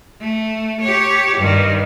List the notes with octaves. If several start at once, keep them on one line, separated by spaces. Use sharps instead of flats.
A3
G4 C#5
G2 D#3